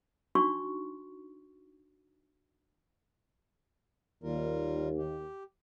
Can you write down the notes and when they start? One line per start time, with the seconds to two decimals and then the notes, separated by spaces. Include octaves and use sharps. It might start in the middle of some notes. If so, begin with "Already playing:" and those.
0.35 D4 D#4 F#4 C6 C#6
4.23 D#2 G3 F4 A#4
4.98 G4